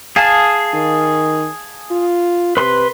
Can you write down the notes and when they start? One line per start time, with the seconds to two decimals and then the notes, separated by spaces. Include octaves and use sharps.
0.16 G#4 F5 A5
0.74 D#3
1.91 F4
2.57 C3 B4 C6